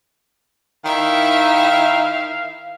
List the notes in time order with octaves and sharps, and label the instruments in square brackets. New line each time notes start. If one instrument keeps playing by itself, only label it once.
[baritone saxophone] D#3 [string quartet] E4 E5 [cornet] F5